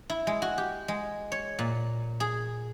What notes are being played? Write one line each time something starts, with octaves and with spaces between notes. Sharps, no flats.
E4
G#3
F#4
G4
G#3
C#5
A#2
G#4